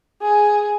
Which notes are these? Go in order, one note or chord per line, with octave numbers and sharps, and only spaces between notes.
G#4